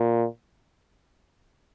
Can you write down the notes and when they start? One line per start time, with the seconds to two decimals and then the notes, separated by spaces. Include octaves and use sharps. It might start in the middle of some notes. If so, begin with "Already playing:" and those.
Already playing: A#2